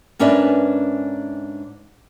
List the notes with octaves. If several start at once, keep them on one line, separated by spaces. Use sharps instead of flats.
G#2 C#4 D4 A#4 B4 E5